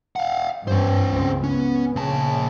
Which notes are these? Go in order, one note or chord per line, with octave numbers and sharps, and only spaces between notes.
F5 F#5
G2 E3 C#4 C5
C#2 C4
B3 C#4
A#2 C#3 A5